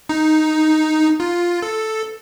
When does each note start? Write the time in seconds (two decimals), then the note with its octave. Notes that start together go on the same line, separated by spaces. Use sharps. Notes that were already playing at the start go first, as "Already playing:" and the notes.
0.09 D#4
1.20 F4
1.62 A4